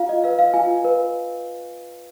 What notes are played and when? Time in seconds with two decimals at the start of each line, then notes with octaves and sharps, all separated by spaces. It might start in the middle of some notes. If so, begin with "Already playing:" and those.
Already playing: F4 F5
0.09 D#5
0.24 B4 F5
0.39 F5
0.54 F4 G#5
0.84 B4